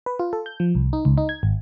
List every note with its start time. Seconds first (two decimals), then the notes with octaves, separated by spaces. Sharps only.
0.06 B4
0.19 F4
0.33 A4
0.46 G6
0.60 F3
0.75 C2
0.93 D#4
1.05 C#2
1.18 D#4
1.29 G#6
1.43 G#1